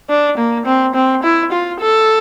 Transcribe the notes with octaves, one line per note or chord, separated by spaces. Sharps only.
D4
A#3
C4
C4
E4
F4
A4